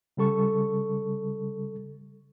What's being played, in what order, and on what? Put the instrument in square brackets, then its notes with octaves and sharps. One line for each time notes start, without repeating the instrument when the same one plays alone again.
[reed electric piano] C#3 G3 A4 C#6